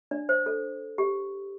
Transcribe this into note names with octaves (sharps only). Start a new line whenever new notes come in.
D4 D5
C5
A4
G4